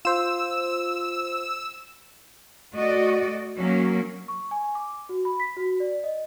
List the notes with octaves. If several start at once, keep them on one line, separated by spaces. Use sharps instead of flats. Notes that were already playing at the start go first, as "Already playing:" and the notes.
F4 C5 E6
A3 F#4 D5 D#5
F#3 A#3 C#4
C#6
G#5
D6
F#4
B5
B6
F#4
D5
D#5